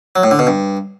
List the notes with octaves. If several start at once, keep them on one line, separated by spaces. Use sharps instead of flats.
F#3
A2
D3
B2
G2